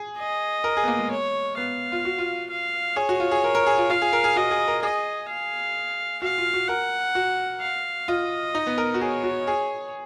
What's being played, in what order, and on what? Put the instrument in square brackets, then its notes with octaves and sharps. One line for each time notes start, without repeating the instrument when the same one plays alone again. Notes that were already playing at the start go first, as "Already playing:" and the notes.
Already playing: [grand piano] G#4
[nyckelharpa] D#5
[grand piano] A#4
G#4
B3
A#3
G#3
[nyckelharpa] C#5
[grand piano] B3 [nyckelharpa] F5
[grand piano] F4
F#4
F4
[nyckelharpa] F5
[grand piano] G#4 [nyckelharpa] C#5
[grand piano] F#4
F4
G#4
A#4
A#4
G#4
F4
[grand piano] F4 [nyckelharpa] F5
[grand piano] G#4
A#4
G#4
[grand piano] F#4 [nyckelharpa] D#5
[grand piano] G#4
A#4
[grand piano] G#4 [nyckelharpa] D#5
[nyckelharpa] F5
[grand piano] F#4 [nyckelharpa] F5
[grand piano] F4
F#4
[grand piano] A#4 [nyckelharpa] F#5
[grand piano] F#4
[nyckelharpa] F5
[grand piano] F4 [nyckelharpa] D#5
[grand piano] D#4
B3
A#4
F#4
[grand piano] G#4 [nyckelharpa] C#5
[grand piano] F#4
G#4